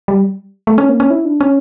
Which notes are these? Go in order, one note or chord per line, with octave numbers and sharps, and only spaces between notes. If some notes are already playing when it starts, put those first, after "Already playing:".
G3
A3
C#4
A#3
C#4
E4
D4
C#4